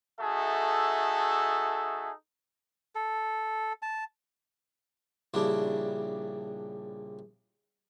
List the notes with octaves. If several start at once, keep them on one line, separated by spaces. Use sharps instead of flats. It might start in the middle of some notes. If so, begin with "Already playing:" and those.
A3 D#4 F#4 G#4 A4 E5
A4
A5
A#1 C#3 G3 D4 E4